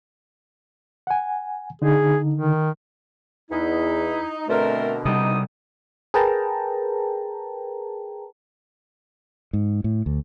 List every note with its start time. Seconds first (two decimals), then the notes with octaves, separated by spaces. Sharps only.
1.07 F#5 G#5
1.82 D3 D#4 G#4
2.34 D#3
3.51 E2 D#4 E4
4.49 B2 D3 A3 C4 A#4
5.05 C3 G3 D#4 D#6
6.14 G#4 A#4 B4 G5 A5 A#5
9.53 G#2
9.84 A2
10.06 D2